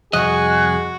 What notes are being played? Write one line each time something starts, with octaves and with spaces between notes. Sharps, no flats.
C2 F2 F#4 G#4 D#5 F#6